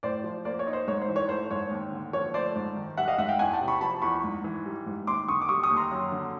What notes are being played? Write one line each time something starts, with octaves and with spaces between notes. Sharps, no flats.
A2 C5 D5
F3
A#3 C5 D5
C#5
D#4
C5
G#2 C#5
C5
E3
C#5
A3 C5
G#2 C#5
D#2
D3
F3 C#5
A3 C5 D5
G#2
D#3
G3 E5 F#5
D#5 F5
G#2 E5 F#5
F5 G5
E2 F#5 G#5
G5 A5
C3
B5 C#6
F3 A5 B5
E2 B5 C#6
G#2
E3
G3
G#2
D#2 C6 D6
D3 C#6 D#6
D6
G3 C#6 D#6
C#6 D#6
D#2
A#5 C6
F#2
D3